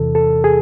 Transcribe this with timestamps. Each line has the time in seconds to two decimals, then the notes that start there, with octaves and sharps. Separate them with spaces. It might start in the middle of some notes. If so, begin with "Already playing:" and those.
Already playing: E2 C3 E3 A4
0.15 A4
0.44 G#4